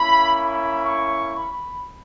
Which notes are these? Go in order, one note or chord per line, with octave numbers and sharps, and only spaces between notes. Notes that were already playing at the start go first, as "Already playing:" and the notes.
Already playing: A#3 C#4 E4 B5
B5
C#6
B5